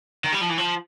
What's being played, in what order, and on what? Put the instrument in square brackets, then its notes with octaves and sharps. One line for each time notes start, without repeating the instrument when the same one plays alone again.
[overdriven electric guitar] D#3
G3
F3
E3
F3